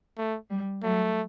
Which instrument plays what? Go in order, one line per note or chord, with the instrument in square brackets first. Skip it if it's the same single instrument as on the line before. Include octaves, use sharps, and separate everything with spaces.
[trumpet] A3
[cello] G3
[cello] F#3 [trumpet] A3